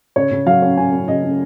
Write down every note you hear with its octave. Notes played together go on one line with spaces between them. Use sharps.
C#3 C#5
C#3
F#3 F5
C#4
C#4 G#5
C#4
C#3 D#5
C#4